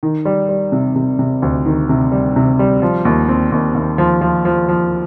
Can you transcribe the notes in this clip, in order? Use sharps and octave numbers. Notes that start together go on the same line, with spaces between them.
D#3
G3
G3
C3
C3
C3
D2
D#3
C3
G3
C3
G3
F3
D#2
C4
D#2
D#2
F3
F3
F3
F3